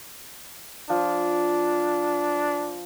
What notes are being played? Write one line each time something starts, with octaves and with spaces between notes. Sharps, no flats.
F3 D4